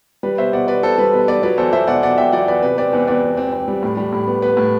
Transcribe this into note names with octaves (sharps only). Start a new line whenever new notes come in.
G3 B4
B2 C5 E5
B2 D5 F#5
B2 B4 D5
B3 A4 C5
G3 B4
B2 B4
B3 B4 D5
F#3 B4 D5
E2 A4 C5
F#3 C5 E5
B2 D5 F#5
B2 D5 F#5
E2 E5 G5
F#3 D5 F#5
E2 B4 D5
C3 B4
C4 B4 D5
E2 B4
E2 B4 D5
E2
C4
C4
G3
A2
G3
A2
B3
B3 B4
A2